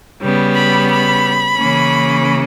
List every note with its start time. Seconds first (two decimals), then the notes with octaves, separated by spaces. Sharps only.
0.22 C#3 G3 B3
0.55 B5
0.90 B5
1.58 C#3 E3 A#3 C#4